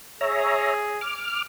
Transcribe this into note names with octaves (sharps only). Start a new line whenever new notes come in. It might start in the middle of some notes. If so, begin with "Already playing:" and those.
G#4 C#5 E5 A#5
D6 F6